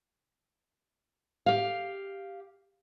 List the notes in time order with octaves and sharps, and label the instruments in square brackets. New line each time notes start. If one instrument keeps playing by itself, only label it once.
[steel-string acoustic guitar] G4 F5